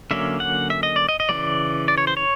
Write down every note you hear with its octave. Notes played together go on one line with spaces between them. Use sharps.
D3 F#3 A#3 C#4 E5
F#5
E5
D#5
D5
D#5
D#5
C#3 E3 G3 D5
D5
C#5
C5
C#5